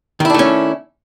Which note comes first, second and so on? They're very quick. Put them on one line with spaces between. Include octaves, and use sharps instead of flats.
D#3 E4 D4 A3 C#4